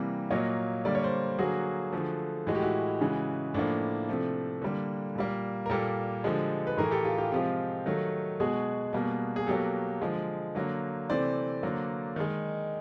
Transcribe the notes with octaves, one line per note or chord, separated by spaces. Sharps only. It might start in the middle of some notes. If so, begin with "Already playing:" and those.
Already playing: C3 E3 G3 A#3
A#2 F#3 A#3 C#5 D#5
D3 G3 A#3 D5
C#5
C5 D5
D3 F#3 A#3 F#4 G#4
D3 F3 A3
A2 E3 G#3 F#4
G4
E4 F#4
C#3 E3 G#3
A2 F3 A#3 D4 E4
C3 F3 A3
D3 G3 A#3
A#2 G3 A#3
A#4
A#2 G3 A#3 G4 A4
D3 F3 G#3
B4
A2 E3 A3 G#4 A#4
G4 A4
F4 G4
F4 G4
C3 F3 G#3 F4 G4
D#3 F#3 A3
B2 G#3 F#4 G#4
B2 G3 A#3
G#4
B2 F#3 A#3 G4 A4
D3 F3 G#3
D3 F#3 A#3
C3 E3 A3 C5 D5
D3 F#3 A#3
D#3 G#3